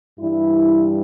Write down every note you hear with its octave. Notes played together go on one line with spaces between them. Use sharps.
G2 E3 G3 E4